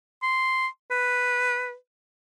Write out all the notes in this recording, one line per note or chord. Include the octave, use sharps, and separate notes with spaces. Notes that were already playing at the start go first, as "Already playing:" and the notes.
C6
B4